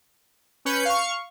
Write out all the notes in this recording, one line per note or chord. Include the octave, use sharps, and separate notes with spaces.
C#4 B4 G6 C#7
F5 C#6